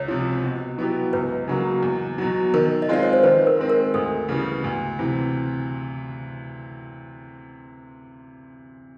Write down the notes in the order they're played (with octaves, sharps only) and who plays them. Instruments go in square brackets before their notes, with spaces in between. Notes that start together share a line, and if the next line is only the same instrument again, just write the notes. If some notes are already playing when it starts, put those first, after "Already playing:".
Already playing: [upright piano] C#2 [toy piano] C#5
[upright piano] C3 F3
B2
F#3 B3 E4 G4
[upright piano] C#2 [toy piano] B4
[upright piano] C#3 F#3 A#3
E2
B2 F#3
[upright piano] D#3 [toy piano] A#4
[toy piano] D#5
[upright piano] G#3 C4 F4 [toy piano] D5
[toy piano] C#5
C5
[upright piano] D#3 [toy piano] B4
[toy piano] A#4
[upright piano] G#3 C4
[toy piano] A#4
[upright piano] D2 [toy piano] A4
[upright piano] C#3 E3 G3 B3
D2
C3 E3